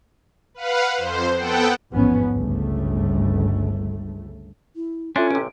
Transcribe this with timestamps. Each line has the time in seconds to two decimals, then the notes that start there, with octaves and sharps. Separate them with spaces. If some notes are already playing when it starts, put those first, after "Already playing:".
0.54 B4 F5 F#5
0.96 F2 C5
1.37 B3 A4 F#5 G5
1.91 A1 E2 G#2 F3 B3 C#4
2.30 G1 C#2 A3
4.76 E4
5.16 C#4 D4 F4 A4 E5 C6
5.31 A1 C3 D7